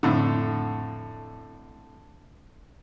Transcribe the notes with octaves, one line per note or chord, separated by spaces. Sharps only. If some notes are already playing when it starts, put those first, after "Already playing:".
F2 A2 D3